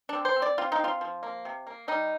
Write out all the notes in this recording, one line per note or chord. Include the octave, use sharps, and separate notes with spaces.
D4
C4
C5
C4
D5
C4 F4
D#4
C4 F4
F3
A#3
C3
A#3
G3 D#4